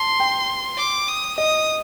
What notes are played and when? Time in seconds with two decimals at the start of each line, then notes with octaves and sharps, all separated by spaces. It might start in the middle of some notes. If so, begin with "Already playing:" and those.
Already playing: A5 C6
0.20 G5
0.78 D6
1.08 D#6
1.38 D#5 D#6